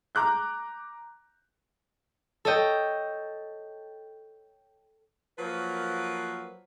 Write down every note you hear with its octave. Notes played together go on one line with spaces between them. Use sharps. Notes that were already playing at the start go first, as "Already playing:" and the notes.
A#5 D6 F#6 G6
A4 C#5 D#5 G5
F3 F#3 A#3 A#4 B4